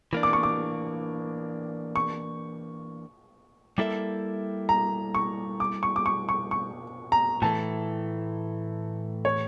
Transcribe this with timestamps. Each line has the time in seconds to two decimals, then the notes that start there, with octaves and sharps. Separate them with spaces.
0.13 E3 A#3 D4
0.23 D6
0.33 C#6
0.43 D6
1.96 C#6
3.78 G3 A#3 E4 A4 E5
4.69 A#5
5.14 C#6
5.60 D6
5.83 C#6
5.96 D6
6.06 C#6
6.29 C#6
6.51 C#6
7.12 A#5
7.42 A2 E3 A3 A5
9.25 C#5